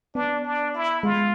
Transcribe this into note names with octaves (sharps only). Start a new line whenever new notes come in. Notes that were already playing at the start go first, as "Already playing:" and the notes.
B3 D4
D4
E4
G#3 F4